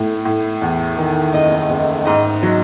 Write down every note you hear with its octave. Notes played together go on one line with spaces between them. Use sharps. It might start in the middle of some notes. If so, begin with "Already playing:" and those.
Already playing: A2 A3
A2
E2
D#3
F#1 D#5
F#1
G#2 D#5
F#3